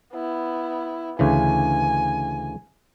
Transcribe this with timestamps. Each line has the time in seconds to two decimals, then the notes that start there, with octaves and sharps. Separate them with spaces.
0.13 B3 E4
1.19 D2 C#3 E3 G#5